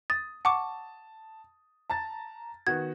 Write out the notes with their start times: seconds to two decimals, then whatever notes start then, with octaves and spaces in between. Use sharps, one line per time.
0.10 D#6 A6
0.45 F#5 A5 C#6 D6
1.90 A5 A#5 A6
2.67 D#3 B3 F#4 G#6